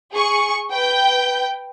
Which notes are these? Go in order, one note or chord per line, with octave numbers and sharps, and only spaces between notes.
G#4 C#6
B4 G5 G6